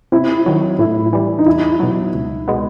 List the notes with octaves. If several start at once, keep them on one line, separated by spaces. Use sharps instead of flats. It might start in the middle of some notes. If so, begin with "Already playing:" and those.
C3 E4
D#3 F#3
A2 E4
E3 G3
D#4
E2 E4
B2 F#3
C#2
B2 G#3 B3